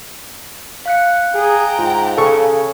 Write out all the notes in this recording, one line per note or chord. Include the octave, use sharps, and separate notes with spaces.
F5 F#6 C#7
G#4 G5 A#5
G#2 F4
C#3 A4 C#6